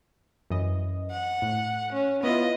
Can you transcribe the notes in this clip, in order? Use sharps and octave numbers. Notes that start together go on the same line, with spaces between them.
F#2 E3 D#5
F#5
A2
C#4
B3 E4 F4 B4 D#5